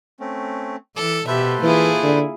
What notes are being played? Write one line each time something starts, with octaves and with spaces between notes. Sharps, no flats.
A3 C4 C#4
E3 A4 D6
B2 G4 A4 B4 C5 E5
E3 A#3 E4 F4 G#4
D3